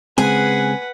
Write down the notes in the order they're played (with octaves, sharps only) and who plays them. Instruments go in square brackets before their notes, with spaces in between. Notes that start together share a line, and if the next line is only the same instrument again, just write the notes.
[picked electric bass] C#3 G#3 C4 [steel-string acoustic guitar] G#4 [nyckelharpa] B4 F#5 [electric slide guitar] G#5